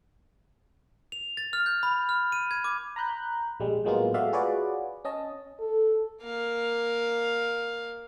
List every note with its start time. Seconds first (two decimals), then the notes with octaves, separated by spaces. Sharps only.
1.12 F7
1.37 A6
1.53 F6
1.66 G6
1.83 B5
2.09 F6
2.32 D#7
2.51 G#6
2.64 D6
2.96 A#5 B5 F#6 G6
3.60 A#1 G3 G#3
3.84 A2 F#3 G#3 A#3 B3 F4
4.14 G#3 A3 F#4 D5 E5 F5
4.33 F4 F#4 G#4 B4 C#5 D5
5.05 C#4 D#5 A5
5.59 A4
6.21 A#3 F5